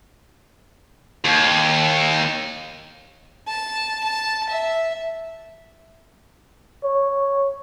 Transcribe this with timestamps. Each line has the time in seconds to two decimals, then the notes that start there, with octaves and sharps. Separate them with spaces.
1.25 D#2
3.48 A5
4.04 A5
4.49 E5
6.84 C#5